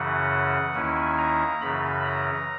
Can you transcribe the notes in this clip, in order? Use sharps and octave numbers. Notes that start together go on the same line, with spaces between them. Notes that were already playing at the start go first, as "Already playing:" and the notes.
Already playing: F#2 C#3 E3 F#5
D#2 D#3 A#3 C#4 E4 G#5
A#5
F#2 C#3 E3 B5
A#5